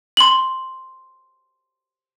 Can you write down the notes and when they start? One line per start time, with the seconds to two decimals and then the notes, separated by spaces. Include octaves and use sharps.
0.17 C6 F#7